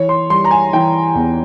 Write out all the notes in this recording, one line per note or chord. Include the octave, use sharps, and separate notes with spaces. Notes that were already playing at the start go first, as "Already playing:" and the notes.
Already playing: E3 C#5
C6
G3 C6
A#5
G#5
E3 G5
E2